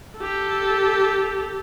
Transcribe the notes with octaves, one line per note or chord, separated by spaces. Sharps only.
G4 A4